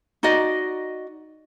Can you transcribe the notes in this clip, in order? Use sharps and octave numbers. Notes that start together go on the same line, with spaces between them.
D#4 F#4 D5 D#5